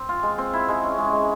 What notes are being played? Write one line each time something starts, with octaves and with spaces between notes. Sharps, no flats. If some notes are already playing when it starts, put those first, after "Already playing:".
Already playing: C4
F4
G#3
C4
E4
G#3
C#4
G#3
G#3